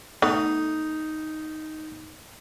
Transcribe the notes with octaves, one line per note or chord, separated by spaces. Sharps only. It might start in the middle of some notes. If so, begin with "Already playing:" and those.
A3 B3 D#4